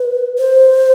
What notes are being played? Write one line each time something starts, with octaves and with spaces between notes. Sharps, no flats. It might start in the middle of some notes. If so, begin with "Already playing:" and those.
Already playing: B4
C5